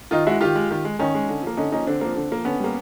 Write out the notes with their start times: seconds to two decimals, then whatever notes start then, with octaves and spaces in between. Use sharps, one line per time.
0.11 D#3 D#4 F4
0.26 G#3 E4 F#4
0.41 D#3 F4 G4
0.55 G#3
0.71 D#3
0.85 G#3
0.99 D#3 C#4 D#4
1.14 G#3
1.28 D3
1.43 F3 A#3
1.57 D3 C#4 D#4
1.72 F3 A#3 C#4 D#4
1.87 D3 C4 D4
2.01 F3 A#3
2.15 D3
2.31 F3 A#3
2.45 D3 B3 C#4
2.60 G3 A#3